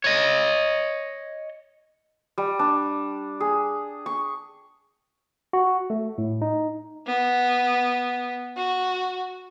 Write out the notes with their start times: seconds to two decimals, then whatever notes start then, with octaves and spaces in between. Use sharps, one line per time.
0.04 C#5 D#5
2.38 G3
2.59 D4
3.40 G#4
4.06 C#6
5.53 F#4
5.90 A3
6.18 A2
6.42 D#4
7.07 B3
8.57 F#4